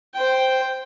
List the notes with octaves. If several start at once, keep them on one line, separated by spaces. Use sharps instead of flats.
C5 G5